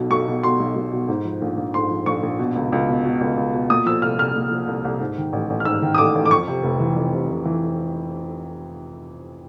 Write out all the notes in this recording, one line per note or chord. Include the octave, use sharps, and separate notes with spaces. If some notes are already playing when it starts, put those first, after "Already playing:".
Already playing: B1 B2
B1 C#6
B2
B2 C6
B1
B1
B2
G#2
F3
A#1
A#1
G#2 C6
F3
A#1 C#6
A#1
B2
C#2
C#2
B2
B2
C#2
C#2
B2
A#2 D#6
F3 E6
C2 F6
C2 F6
A#2
F3
C2
C2
G#2
D#3
A1
A1
F6
G#2 E6
D#3
D#6
A1 D6
A1
D6
F2 C#6
C3
F1
E3
F2
C3
F1
E3